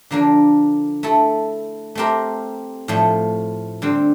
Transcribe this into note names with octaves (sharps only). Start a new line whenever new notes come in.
D3 F3 A#3 D4
A3 E4 A4
A3 C4 G4 A#4
A2 F3 A3
D3 G3 C4